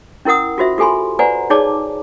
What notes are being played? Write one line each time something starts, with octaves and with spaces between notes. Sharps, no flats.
C#4 E4 A#4 F#5 D#6
F4 F#4 C5 E5
F4 G4 A4 G#5 B5 C6
B4 C5 D5 F#5 G#5 A#5
D#4 G#4 C#5 D5 A5 D6